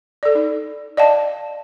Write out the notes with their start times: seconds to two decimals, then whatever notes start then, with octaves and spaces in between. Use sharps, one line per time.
0.23 A4 D5
0.35 D#4
0.97 D5 D#5 F5 G5 A5